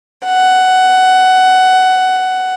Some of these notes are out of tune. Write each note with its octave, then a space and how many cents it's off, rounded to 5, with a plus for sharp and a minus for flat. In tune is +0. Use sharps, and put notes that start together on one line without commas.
F#5 +10